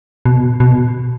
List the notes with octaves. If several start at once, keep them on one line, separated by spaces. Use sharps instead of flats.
B2
B2